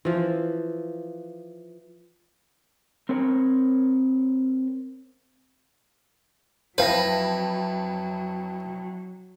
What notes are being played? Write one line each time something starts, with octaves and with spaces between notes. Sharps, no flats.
E3 F3
C4 A#4 C#5
F2 F#3 E4 B4 C5 F5 A#6